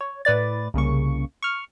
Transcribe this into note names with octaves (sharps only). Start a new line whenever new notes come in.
C#5
A2 B4 D5 A6
C2 C#3 A#3 C#6
C#6 F6